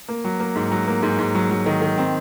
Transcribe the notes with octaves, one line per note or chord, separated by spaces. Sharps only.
A#3
F#3
A#3
G#2
F#3
A#3
G#2
G#2
F#3
F#3
D#3
D#3
C4